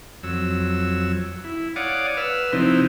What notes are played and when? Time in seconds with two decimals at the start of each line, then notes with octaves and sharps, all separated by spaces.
0.23 F2 F#3 E6
1.44 E4
1.76 C#5 D5 F5 F#5 D6 D#6
2.17 B4 E6 F6
2.53 C3 F3 C4 D#4 E4